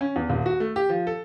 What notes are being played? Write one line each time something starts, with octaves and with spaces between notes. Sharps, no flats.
C#4
E2
D#1
F#4
A3
G4
F3
A4